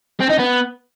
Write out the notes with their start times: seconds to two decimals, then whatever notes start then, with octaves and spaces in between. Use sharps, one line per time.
0.20 C4
0.29 D#4
0.39 B3